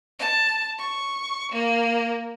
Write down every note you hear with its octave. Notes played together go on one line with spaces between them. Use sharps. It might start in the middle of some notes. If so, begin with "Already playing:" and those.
A5
C#6
A#3